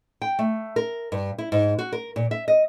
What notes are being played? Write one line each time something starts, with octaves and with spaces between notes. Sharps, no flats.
G5
A3
A#4
G2
E4
G#2
F#4
A#4
A#2
E5
D#5